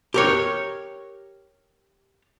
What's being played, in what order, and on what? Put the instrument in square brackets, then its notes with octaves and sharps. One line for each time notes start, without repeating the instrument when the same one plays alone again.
[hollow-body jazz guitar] G4 A#4 C#5